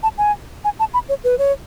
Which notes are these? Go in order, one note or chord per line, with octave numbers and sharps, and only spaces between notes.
A5
G#5
G#5
A5
B5
C#5
B4
C#5